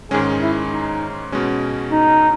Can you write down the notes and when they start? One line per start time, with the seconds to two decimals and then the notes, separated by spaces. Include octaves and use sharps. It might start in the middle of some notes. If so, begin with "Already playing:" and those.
0.11 G#2 D#3 G#3 C#4 G#4
0.41 E4
0.71 D#4
1.32 B2 G#3 C#4
1.92 D#4